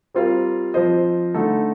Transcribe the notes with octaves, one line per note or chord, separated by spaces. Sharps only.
G3 C4 F4 A#4 F5
F3 C4 F4 C5 D#5
D3 A3 D#4 A4